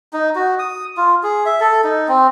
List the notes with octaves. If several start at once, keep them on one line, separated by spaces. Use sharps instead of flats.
D#4
F#4
D#6
F4
G#4
E5
A4
D#4
C4